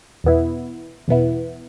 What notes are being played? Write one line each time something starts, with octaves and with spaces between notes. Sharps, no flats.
E2 B2 B3 E4
E2 B2 B3 E4